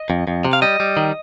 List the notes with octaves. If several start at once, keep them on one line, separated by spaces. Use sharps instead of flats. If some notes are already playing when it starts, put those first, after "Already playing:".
Already playing: D#5
F2
F2
C3
F5
G3 D#5
G3
D#3